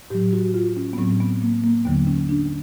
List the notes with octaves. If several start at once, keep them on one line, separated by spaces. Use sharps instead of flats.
A2 F#3 G4
F#4
F4
C#4
B3
A2 F#3 C4
B3
A#3
A#3
D#2 D3 F#3 B3
C#4
D4